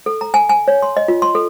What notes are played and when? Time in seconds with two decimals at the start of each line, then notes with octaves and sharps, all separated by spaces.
0.06 A4
0.21 A#5
0.34 G#5
0.50 G#5
0.68 C#5
0.82 C6
0.97 D#5
1.08 F4
1.22 C6
1.35 A4